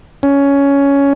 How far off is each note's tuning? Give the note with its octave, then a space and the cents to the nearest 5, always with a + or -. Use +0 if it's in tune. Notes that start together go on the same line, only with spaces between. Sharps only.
C#4 +10